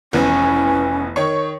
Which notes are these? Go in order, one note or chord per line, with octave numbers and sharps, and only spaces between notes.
F1 E3 B3 C#4
D#3 C#5 C#6